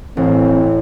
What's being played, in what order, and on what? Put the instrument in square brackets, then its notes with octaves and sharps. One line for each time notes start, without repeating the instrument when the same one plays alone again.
[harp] A1 [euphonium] C4